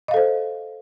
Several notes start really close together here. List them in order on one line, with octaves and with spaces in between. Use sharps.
D#5 F5 A4 C5